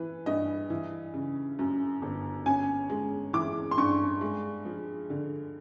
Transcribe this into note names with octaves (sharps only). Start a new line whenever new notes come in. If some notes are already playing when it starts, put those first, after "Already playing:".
Already playing: E3 B4
G2 D#5
E3
C#3
F#2
G1
C#4 G#5
G#3
E3 D6
C6
G2 C#6
G#3
F3
D3